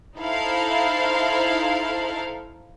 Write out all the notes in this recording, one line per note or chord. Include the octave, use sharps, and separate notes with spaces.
D#4 E4 A4 C5 F5